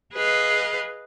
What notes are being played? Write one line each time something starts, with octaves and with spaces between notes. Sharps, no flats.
G#4 B4 D#5 F5